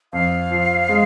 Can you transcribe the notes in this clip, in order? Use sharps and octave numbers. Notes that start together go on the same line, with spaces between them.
F2 F5
F3
G#3